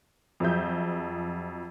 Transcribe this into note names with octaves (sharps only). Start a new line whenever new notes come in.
F2 F3 F#3 G#4 E5 G6